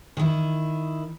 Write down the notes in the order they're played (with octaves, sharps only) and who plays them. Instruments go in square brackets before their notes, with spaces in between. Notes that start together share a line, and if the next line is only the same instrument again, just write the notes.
[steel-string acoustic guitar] D#3 E4